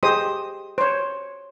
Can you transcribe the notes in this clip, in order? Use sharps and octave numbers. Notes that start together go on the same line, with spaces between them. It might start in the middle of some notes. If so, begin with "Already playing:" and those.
G4 G#4 C5 D#5 D#6
C5 C#5